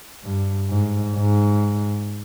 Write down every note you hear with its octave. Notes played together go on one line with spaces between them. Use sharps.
G2
G#2
G#2